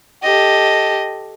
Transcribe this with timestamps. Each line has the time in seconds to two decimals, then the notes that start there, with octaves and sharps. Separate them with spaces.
0.23 G4 A4 D#5